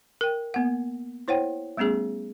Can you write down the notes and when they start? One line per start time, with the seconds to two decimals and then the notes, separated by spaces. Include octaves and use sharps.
0.21 A#4 G5
0.54 A#3 B3 F#5
1.28 E4 C5 C#5 F#5 G5
1.77 G3 A3 B3 C#4 G#4